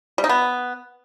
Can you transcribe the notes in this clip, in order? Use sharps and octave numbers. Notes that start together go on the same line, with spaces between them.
G3
D#4
B3